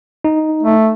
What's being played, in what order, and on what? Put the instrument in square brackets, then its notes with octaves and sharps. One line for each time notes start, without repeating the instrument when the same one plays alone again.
[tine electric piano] D#4
[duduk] A3